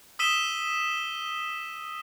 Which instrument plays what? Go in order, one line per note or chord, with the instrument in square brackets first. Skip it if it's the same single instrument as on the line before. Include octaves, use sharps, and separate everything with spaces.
[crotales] D#6 E6 B6 D#7 E7 G7